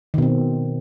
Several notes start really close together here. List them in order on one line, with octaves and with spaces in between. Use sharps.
D#3 B2 C4